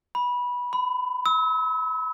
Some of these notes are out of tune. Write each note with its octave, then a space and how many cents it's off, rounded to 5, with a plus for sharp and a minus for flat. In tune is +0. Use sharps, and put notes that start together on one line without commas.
B5 -15
B5 +30
E6 -40